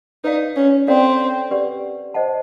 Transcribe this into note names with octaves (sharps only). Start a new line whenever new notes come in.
D#4 B4 D5 F5
C#4
C4 C#4 E4 A4 D5 F5
G4 B4 D5 F#5
C5 D#5 F#5 A5